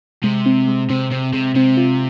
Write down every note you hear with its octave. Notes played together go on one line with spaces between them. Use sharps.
C3 G#3
C4
G#3
C3 C4
C3 C4
C3 G#3
C3 C4
F4